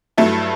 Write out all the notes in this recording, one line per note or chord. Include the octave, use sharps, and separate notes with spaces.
G2 F#3 A3 E4